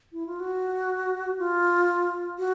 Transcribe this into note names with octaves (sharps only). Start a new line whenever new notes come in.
E4
F4
F#4
F4
F#4